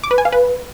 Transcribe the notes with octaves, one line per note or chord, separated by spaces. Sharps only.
D6
B4
G#5
F5
B4